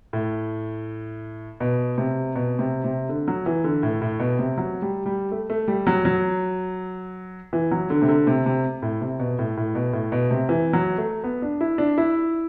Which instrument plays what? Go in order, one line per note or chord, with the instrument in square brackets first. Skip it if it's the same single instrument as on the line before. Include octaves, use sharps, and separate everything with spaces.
[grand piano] A2
B2
C3
B2
C3
C3
D3
F#3
E3
D3
A2
A2
B2
C3
F#3
G3
G3
A3
A3
G3
F#3
F#3
E3
F#3
D3
C3
D3
C3
C3
A2
C3
B2
A2
A2
B2
A2
B2
C3
E3
F#3
A3
B3
D4
E4
D4
E4